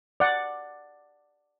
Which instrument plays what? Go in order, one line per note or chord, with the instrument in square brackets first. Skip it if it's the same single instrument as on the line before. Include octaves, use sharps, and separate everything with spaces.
[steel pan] D5 F#5